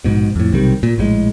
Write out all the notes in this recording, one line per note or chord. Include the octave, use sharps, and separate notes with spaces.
A#1 G#2 B2
F2 A2
B1 C3 D#3 G3
A#2
A#1 A2 E3 G#3